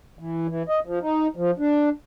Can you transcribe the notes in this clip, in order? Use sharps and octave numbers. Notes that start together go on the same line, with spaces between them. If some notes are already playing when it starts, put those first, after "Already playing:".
E3
E3
D#5
F3
D#4
F3
D4